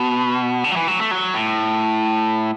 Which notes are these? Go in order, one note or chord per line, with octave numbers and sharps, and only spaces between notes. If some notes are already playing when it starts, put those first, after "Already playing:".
Already playing: B2
D3
F#3
E3
F#3
A3
F#3
A2